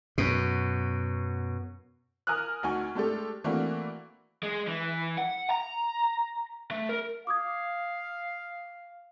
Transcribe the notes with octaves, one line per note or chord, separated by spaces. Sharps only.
F#2 B2
A#4 G#5 D#6 F6 F#6
D2 D#4 F#4 G#5 C#6
G#3 A3 D4 G4 A4
E3 A3 A#3 C4 D4 F#4
G#3
E3
F#5
A#5
A3
A#4
F5 D6 D#6 G#6